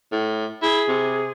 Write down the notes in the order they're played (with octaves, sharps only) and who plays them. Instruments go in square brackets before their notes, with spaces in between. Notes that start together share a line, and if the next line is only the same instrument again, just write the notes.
[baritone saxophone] A2
[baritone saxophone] E4 [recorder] G#4
[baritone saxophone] C3